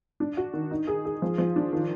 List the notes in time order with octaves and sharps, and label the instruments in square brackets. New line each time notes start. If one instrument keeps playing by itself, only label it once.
[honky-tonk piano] D4
F#4
D#3
D#4
G#4
G#4
F3
F3
D4
D#3